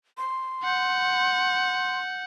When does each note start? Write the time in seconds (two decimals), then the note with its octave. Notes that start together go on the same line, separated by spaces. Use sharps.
0.18 C6
0.64 F#5 G6